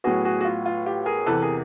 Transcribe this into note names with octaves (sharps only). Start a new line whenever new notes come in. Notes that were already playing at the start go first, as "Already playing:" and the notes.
A2 F#3 B3 F#4 G#4
F#4 G#4
F#4
F4
F4
F4 G4
G#4 A#4
E2 C3 E3 A4 B4
G#4 A#4